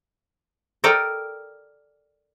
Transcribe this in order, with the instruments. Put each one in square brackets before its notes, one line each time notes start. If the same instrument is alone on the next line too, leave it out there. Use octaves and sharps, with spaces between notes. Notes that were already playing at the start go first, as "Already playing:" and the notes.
[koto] A4 A#4 D5 D#5 G5